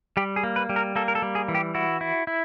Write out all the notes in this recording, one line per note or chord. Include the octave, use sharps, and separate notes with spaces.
G3 G4
G#4
A#3
B4
G3
A#4
A#3 A4
A#4
A4
G3
G#4
E3
G4
E4 F#4
E4
E4